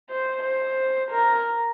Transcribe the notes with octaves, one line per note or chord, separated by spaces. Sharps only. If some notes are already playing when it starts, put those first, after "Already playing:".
C5
C5
A#4